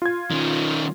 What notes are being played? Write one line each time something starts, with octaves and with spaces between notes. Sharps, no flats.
F4 G#6
D#3 C#4